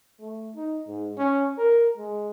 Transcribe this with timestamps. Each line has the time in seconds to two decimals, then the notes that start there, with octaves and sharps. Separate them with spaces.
0.20 A3
0.56 D#4
0.88 G#2
1.18 C#4
1.58 A#4
1.97 G#3